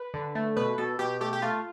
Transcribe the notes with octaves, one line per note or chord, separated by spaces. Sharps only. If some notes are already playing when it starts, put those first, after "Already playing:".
Already playing: B4
D3
A3
B2 B4
B2 A4
B2 G4
A3 G4
G4
A3 F4